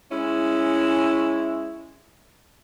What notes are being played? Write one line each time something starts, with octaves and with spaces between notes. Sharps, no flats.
G#3 C#4 E4